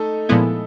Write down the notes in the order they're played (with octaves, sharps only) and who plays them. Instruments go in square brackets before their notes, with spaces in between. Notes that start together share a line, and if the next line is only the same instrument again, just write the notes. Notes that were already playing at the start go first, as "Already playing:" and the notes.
Already playing: [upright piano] A3 D#4 A4 D#5
[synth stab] A#2 F3 G#3 B3 E4